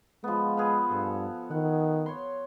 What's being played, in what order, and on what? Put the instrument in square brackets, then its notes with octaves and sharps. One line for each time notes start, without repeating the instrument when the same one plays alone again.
[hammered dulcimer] F3 B3 [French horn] G#3
[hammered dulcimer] G#4 B4 F5
[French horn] G2 [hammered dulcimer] A4
[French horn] D#3 [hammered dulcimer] F#5
[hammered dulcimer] C#5 C6